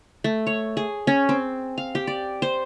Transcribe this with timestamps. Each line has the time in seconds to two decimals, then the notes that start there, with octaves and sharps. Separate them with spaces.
0.24 A3
0.47 C#5
0.77 G#4
1.07 C#4
1.29 C4
1.78 F5
1.95 G4
2.07 D5
2.42 C5